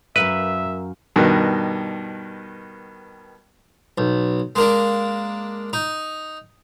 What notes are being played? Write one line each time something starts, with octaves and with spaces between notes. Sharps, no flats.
F#2 A#4 B4 E5 F5
G2 B2 D#3
B1
G#3 A#3 D4
D#4